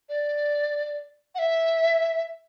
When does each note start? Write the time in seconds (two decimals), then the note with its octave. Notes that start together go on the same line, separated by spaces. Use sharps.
0.09 D5
1.35 F#5
1.39 E5